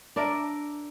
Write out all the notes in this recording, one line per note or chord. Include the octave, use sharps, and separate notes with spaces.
D4 A#4 D5 E5